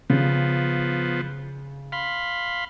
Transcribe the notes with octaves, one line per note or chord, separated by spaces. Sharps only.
C#3 F3 B3
F5 B5 C6